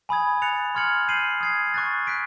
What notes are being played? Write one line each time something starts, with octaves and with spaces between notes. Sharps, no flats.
G#5 B5 D#6 G#6
F#6 A6 C#7 F7
C6 F6 G#6 C#7 F#7
G6 C7 D#7 F#7
D#6 G#6 C7
C#6 F#6 A6
F#6 B6 D7